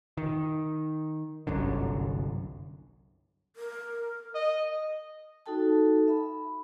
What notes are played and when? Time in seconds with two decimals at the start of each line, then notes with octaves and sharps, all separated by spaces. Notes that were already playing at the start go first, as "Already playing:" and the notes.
0.17 D#3
1.47 G1 C2 F#2 D3
3.56 A#4
4.35 D#5
5.46 D#4 F#4 A4 G5 A5
6.08 E5 B5